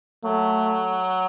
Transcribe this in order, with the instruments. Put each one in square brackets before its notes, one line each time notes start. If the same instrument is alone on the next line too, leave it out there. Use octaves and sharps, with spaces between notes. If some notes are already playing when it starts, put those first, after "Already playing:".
[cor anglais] F#3 [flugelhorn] A3